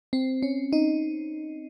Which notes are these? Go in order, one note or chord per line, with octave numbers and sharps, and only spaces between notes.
C4
C#4
D#4